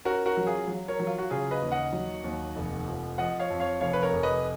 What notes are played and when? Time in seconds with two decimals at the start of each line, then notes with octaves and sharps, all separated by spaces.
0.05 C#4 F#4 A#4
0.26 F#4 A#4
0.37 F#3
0.47 F4 G#4
0.67 F#3
0.88 A#4 C#5
1.00 F#3
1.07 F4
1.18 F#4
1.30 C#3 F4 G#4
1.51 B4 D#5
1.62 D#2
1.72 D#5 F#5
1.93 F#3
2.24 D#2
2.56 F1
2.88 F3
3.18 F3 D#5 F#5
3.40 C#5 F5
3.50 F2
3.60 C#5 F5
3.81 F1 C#5 F5
3.93 B4
4.02 A#4 C#5
4.13 F1
4.23 B4 D#5